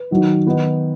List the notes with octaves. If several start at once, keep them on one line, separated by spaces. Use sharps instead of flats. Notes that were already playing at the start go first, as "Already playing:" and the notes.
Already playing: B4
D#3 F#3 D#4
D#3 B3 D#4